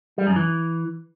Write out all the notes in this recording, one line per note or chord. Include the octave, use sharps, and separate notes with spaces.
G3
F#2
E3